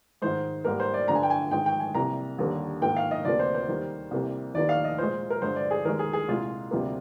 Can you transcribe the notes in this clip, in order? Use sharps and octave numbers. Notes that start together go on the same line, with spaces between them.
G#2 D#3 G#3 C5
G#2 G3 A#3 A#4
C5
D5
G2 D3 F3 A#5
G#5
G5
G#5
G#2 D#3 G#3 G5
G5
G#5
C2 C3 G3 A#3 A#5
D#2 D3 G3 A#3
G#2 D#3 A#3 G5
F5
D#5
D2 C3 F3 A#3 D5
C5
C5
D#2 D#3 G3 A#3
C2 C3 G3 A#3
D#2 D#3 A#3 D5
F5
D#5
A#2 G#3 C5
A#4
G2 D3 G#3 C5
D5
G#4
D#2 D#3 G#3 A#4
G#4
G#4
C2 A#2 G#3 F4
D2 C3 G3 A#3